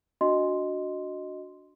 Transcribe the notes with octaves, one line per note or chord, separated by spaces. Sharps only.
D4 F#4 D#5 C6